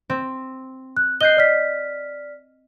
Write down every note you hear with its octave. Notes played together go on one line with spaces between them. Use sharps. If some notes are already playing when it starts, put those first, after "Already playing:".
C4
F#6
D#5 F#6 G6 C7 G7
D5 F6 B6